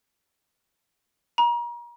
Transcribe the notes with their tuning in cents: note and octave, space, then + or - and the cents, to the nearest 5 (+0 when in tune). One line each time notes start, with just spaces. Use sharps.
A#5 +35